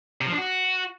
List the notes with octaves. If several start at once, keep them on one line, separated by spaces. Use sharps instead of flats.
C3
F3
D4
F#4